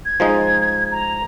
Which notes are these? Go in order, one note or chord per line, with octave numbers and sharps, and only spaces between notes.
G#6
F3 G#3 D#4
A#5